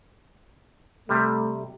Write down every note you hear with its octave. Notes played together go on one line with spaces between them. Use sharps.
C3 G3 A3